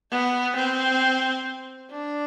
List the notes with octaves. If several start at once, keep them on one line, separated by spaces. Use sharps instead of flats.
B3
C4
D4